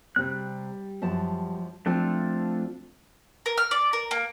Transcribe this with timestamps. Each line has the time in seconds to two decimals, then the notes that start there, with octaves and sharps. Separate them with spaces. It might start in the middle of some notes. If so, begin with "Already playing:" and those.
0.16 C3 G3 C4 F#6
1.02 F#2 F3 A5
1.86 F3 A3 C4 D4 F4 A4
3.46 A#4
3.58 F6
3.71 D5
3.93 A#4
4.11 A#3